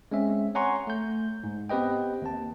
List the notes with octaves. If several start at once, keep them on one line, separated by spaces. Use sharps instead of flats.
G#3 C4 C#4 E5
C#5 F#5 G#5 A#5 C6 C#6
A3 G6
G#2
B3 C4 G4 B4 D#5 G5
D#2 A5